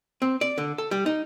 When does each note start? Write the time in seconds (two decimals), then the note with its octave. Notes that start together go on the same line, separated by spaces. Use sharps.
0.22 C4
0.41 D5
0.58 D3
0.78 A4
0.91 G3
1.06 D#4